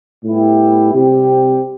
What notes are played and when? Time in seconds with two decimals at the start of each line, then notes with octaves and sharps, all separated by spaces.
0.24 A2 G3 B3 E4 G4
0.93 C3 G3 C4 G4